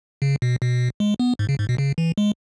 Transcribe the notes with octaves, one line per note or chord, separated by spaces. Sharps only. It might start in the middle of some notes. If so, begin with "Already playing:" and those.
C#3
B2
B2
G#3
B3
G#2
C#3
G#2
B2
C#3
E3
G#3